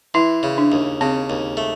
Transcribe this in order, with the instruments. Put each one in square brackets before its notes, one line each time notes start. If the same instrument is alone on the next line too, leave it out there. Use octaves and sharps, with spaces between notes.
[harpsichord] E3 [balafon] E4
[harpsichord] C#3
[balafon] D4
[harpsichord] D#2
[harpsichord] C#3 [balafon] C4
[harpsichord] D#2
A3